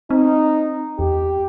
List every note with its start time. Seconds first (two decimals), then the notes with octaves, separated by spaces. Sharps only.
0.10 C4 D#4
0.99 E2 G4